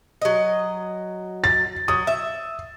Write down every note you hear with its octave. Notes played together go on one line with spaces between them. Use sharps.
F#3 D#5
A6
F#3 D#6
E5